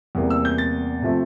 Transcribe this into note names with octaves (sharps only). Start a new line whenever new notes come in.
E2 C3 G3 A#3
E6
G6
A6
C3 F3 A3